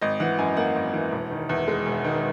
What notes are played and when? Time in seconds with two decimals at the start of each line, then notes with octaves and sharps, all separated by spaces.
0.01 G#1 D#5
0.20 E3 F#5
0.38 F#2 G#5
0.57 A#3 F#5
0.75 G#1
0.94 E3
1.12 E1
1.31 D#3
1.49 E2
1.68 G#3
1.86 E1
2.04 D#3